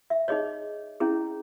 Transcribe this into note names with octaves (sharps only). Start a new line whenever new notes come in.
E5
D#4 G#4 C#5 D#5
C#4 E4 G#4